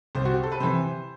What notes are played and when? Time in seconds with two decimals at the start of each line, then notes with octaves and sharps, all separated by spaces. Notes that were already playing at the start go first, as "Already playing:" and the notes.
0.15 C2 C5
0.25 F#4
0.34 G4
0.43 A4
0.52 B4
0.60 C3 E3 C5